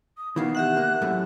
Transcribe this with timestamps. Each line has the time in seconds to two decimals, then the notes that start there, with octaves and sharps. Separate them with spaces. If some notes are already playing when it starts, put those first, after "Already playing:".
0.17 D#6
0.36 B2 D#3 E3 F5
0.55 G4 E5 F#5 F#6
0.77 A#3
1.02 F#2 A2 A3